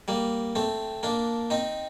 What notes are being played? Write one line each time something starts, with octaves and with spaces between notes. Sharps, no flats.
G3 A#3
A3 C4
A#3 D4
C4 D#4